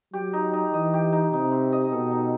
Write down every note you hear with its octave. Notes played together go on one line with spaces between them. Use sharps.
F#3 G4
D#4
D#4
E3 D#5
G4
D#4
C3 D#4
C4
D#5
B2 A4
D#4